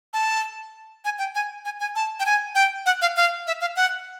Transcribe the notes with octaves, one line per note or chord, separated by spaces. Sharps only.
A5
G#5
G5
G#5
G#5
G#5
A5
G5
G#5
G5
F#5
F5
F5
E5
F5
F#5